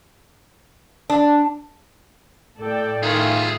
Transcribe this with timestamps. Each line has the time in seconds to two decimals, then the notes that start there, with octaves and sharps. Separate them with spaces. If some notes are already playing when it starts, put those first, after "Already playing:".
1.10 D4
2.58 A2 A4 D5 G5
3.03 D#3 F4 G#4 E5 F5